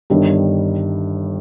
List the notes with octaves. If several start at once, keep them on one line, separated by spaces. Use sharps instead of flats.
G1 G2 D#3 G3